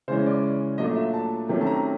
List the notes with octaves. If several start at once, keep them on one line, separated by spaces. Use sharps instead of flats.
C#3 E3 G#3 C#4 C5
D5
A#2 F#3 A3 D4 F4 D#5
E5
A5
C3 D#3 F#3 A3 C#4
A5
A#5